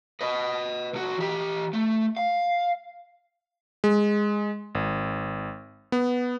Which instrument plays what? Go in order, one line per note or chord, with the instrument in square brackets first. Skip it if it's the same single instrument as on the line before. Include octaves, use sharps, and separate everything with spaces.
[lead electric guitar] B4 D#5
C2 F#4
E3 G4
A3
F5
[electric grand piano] G#3
G#1
B3